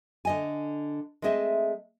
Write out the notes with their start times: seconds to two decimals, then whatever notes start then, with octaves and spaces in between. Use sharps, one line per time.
0.25 D3 D#5 G#5
1.22 G#3 A3 C4 G#4 D#5 E5